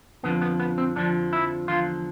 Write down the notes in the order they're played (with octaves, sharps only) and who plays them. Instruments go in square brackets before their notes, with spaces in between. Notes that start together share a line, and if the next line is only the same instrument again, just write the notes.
[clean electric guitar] F2 D3 F3 B3
B3
B3
C4
F2 D3 F3 D4
E4
E2 D3 F3 F4